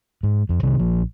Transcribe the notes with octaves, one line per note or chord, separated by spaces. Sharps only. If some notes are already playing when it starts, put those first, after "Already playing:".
G#2
F2
C2 C3 D#3 F3
A#1 F3